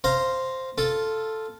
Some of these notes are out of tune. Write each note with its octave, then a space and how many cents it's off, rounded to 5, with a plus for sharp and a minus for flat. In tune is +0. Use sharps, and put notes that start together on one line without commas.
C5 +0 F5 -10 A#5 +0
F4 +0 A4 +0